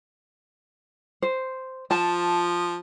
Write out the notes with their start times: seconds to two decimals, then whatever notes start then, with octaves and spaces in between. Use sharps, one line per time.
1.22 C5
1.91 F3 A5